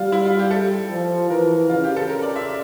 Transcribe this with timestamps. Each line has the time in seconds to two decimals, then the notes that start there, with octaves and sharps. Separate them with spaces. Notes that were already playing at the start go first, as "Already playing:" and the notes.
Already playing: G3 F4
0.12 E4
0.25 F4
0.39 G4
0.51 A4
0.91 F3
1.30 E3 A#4
1.69 C#3 F4
1.84 G4
1.96 A4
2.09 A#4
2.22 D5
2.36 E5
2.48 E5